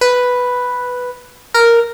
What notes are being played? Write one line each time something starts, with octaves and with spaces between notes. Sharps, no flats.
B4
A#4